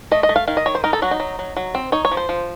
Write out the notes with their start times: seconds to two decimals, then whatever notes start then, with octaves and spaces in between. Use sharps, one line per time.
0.11 A3 D#5
0.23 D#5
0.29 A3
0.36 F5
0.47 D#3 F5
0.57 D#5
0.66 D#3 C#5
0.75 C5
0.84 D#4 A#4
0.93 A4
1.02 F#3 F#4
1.11 D#4
1.20 F#3
1.39 F#3
1.56 F#3
1.75 C4
1.92 D#4 C#5
2.05 C#5
2.11 F3
2.17 C5
2.29 F3